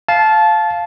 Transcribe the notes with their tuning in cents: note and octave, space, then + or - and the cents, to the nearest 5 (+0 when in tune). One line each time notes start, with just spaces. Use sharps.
F5 +0 A5 -20